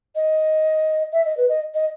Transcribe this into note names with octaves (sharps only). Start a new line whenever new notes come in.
D#5
E5
D#5
B4
D#5
D#5